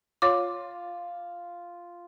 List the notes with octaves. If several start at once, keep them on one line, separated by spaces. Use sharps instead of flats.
F4 C#5 D6